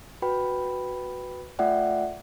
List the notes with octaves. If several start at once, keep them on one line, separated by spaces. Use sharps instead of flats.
F#4 B4 G5 B5
A3 F4 D5 E5 F#5 G5